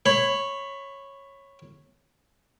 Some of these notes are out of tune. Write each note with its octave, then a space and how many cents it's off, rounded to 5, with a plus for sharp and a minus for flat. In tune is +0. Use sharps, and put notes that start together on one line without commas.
C#5 -10 B5 +15